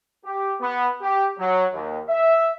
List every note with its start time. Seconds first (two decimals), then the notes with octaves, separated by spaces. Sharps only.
0.24 G4
0.61 B3
1.02 G4
1.39 F#3
1.73 D#2
2.09 E5